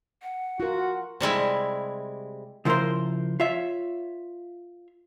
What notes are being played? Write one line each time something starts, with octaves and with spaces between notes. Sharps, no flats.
F#5
F4 F#4 A#4
C3 G3 G#3 E4
C#3 F3 E4 G#4 A#4 C5
F4 C#5 E5